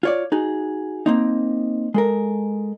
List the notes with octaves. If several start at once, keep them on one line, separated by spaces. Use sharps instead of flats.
F4 C#5 D5
D#4 F#4 G#4
A#3 C4 D#4
G#3 A4 A#4